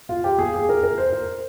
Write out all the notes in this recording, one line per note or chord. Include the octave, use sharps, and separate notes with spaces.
F4
G4
G#4
G#4
A#4
A#4
C5
A#4